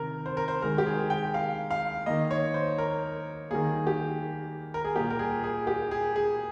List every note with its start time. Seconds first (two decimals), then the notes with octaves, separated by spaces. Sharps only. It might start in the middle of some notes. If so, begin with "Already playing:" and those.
Already playing: C3 D#3 A#4
0.26 C5
0.37 A#4
0.48 C5
0.62 D#3 G#3 A#4
0.78 G4
0.86 G#4
1.10 G5
1.34 F5
1.71 F5
2.06 D#3 A#3 D#5
2.31 C#5
2.54 C5
2.78 A#4
3.50 D#3 G3 A#3 G#4
3.87 G4
4.74 A#4
4.84 G#4
4.96 A#2 G3 A#3 G4
5.10 A#4
5.19 G#4
5.44 G#4
5.67 G4
5.91 G#4
6.16 G#4